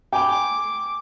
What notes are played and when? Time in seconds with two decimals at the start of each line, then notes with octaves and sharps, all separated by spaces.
0.13 G5 G#5 B5 D6